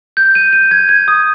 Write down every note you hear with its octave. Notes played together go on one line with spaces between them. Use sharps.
G6
D#7
D#7
G#6
G#6
D#6